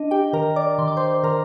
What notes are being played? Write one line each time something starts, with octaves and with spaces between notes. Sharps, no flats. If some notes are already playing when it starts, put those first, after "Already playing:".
Already playing: D4 D#5
G4 G5
D#3 A#4 A#5
D5 D6
D#3 C6
D6
C5 C6
D#3 A#4 A#5